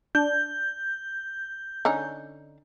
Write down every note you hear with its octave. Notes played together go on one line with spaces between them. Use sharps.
D4 G6
D3 C#4 D#4